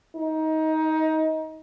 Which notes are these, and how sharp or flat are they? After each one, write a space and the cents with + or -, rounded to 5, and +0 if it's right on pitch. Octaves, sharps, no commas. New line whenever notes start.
D#4 +20